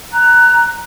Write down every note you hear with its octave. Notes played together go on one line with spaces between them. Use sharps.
A#5 F#6